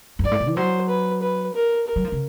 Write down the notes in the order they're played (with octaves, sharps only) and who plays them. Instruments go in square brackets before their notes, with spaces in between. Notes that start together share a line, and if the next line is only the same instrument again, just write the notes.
[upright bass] F#2
[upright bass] G2 [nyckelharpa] D5
[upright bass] A2
A#2
E3
[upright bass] F#3 [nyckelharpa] C5
[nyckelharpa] B4
B4
A#4
A#4
[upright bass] F#3
F3
C#3